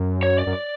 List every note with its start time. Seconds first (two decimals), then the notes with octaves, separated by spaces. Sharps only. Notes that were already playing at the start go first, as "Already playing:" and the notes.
Already playing: F#2
0.23 C#5
0.38 D5
0.47 F#2